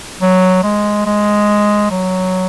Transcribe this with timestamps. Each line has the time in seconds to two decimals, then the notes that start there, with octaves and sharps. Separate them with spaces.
0.21 F#3
0.63 G#3
1.06 G#3
1.91 F#3